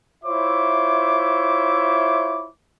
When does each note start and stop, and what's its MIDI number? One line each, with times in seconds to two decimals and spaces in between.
0.25 2.48 64
0.25 2.48 65
0.25 2.48 72
0.25 2.48 73
0.25 2.48 76
0.25 2.48 86